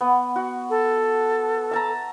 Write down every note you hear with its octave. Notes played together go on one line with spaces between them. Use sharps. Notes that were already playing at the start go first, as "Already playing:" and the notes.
B3
F#4
A4
E5 A5 A#5